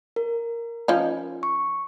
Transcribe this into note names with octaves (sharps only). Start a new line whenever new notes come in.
A#4
F3 C#4 D#4
C#6